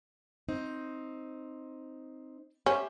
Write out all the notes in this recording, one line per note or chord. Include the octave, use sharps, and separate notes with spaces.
C4 D#4
C#4 G4 C5 E5